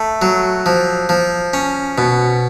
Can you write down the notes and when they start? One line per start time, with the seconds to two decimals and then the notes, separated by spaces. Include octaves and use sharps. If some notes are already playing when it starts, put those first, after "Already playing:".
Already playing: A3
0.22 F#3
0.66 F3
1.09 F3
1.53 C#4
1.98 B2